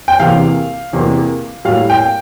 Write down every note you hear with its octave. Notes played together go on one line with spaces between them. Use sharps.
G5
E2 C3 E3 A#3 F5
E2 C3 E3 A#3
A2 G3 A#3 F5
G5